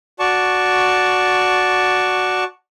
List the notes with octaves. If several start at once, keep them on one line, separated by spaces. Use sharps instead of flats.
F#4 D5 A5 C#6